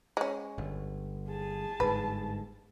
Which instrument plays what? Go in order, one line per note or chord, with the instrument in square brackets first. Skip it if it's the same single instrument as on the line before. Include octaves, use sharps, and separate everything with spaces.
[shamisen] G#3 C#4
[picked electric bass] G1
[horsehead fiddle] G#4 A5
[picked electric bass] G1 G#2 [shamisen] B4